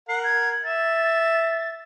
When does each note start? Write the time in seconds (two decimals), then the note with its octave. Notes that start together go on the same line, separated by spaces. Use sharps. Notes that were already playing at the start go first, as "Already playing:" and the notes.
0.09 A#4 F#5 C7
0.24 G#6
0.63 E5 A6